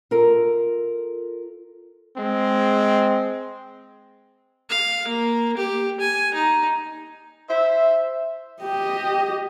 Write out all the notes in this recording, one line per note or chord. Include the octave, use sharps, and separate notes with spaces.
F4 A4 A#4
G#3 C4
F5
A#3
G4
G#5
D#4
C5 E5
G4 D#5